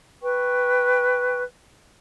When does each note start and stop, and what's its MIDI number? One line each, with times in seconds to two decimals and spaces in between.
0.22 1.43 71
0.22 1.43 79
0.22 1.43 85